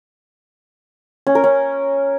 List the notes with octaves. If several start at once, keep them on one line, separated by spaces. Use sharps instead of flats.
C#4
A#4
C#4